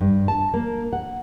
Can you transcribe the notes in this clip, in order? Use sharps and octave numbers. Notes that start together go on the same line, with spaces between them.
G2
A5
A#3
F#5